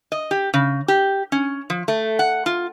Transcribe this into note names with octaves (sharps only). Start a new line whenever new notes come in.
D#5
G4
C#3
G4
C#4
F3
A3
F#5
F4